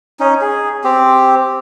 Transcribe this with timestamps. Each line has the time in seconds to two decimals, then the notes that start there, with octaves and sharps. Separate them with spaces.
0.20 C#4 D#4
0.41 G#4
0.84 C4 G4